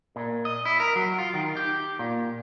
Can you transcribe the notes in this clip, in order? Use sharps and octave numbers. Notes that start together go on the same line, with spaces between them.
A#2
D#5
E4
A#4
F#3
F4
D#3
G4
A#2